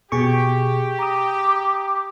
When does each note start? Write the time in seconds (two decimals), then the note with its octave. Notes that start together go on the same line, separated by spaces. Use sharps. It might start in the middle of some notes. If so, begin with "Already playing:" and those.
0.12 B2 G4 G#4 C#6
0.99 A#5 D6 D#6